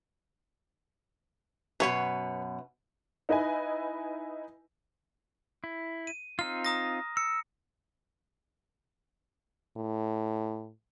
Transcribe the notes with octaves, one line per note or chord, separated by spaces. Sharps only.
F#2 B2 B4 C#5
D#4 E4 B4 D#5 E5 G#5
E4
D#7
C4 D#4 F4 F6
A#5 D#6 A#6
E6 C#7
A2